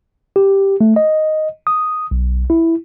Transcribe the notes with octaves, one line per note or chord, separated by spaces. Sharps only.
G4
A3
D#5
D#6
B1
E4